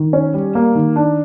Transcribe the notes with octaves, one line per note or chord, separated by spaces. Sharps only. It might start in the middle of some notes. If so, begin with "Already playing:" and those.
Already playing: D#3
C#4
G3
A#3
D#3
D4